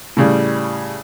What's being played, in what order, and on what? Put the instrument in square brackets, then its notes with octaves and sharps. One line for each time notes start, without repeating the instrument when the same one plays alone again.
[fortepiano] A2 C#3 G3